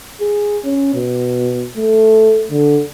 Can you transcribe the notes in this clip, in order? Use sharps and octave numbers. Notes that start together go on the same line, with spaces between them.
G#4
C#4
B2
A3
D3